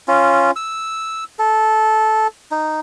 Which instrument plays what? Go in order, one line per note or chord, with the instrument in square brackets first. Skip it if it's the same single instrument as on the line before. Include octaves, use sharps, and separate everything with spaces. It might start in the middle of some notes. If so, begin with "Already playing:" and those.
[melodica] C#4 F4
E6
A4
D#4